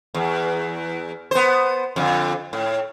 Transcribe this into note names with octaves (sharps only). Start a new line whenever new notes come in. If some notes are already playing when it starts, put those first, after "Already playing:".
E2
B3 C5
F2 D3
A2